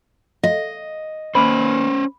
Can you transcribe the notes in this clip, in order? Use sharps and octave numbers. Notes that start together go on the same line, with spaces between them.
D#5 F5
D#2 A#3 C#4 B4 C5 B5 D6